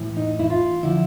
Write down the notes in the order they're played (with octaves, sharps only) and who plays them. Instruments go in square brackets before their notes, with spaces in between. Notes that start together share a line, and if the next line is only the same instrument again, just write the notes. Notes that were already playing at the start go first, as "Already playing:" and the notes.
Already playing: [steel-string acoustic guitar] A2 E3
D#4
E4
F4
D3 F3 E4